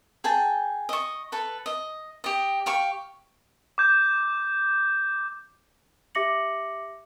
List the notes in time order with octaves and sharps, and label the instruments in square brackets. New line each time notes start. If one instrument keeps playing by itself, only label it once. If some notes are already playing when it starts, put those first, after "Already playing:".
[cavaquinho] G#4 G5 A5
D#5 C#6
A4 B4
D#5
G4 D#5
G4 F5 C#6
[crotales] D6 G6
[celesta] G4 E5 D6 A#6 C#7 F#7